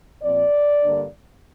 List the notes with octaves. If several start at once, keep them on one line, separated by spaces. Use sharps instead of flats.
A#2 F3 C4 D5
G2 D3 A#3 D4